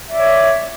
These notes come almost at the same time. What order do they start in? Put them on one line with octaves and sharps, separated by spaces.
E5 D5 C#5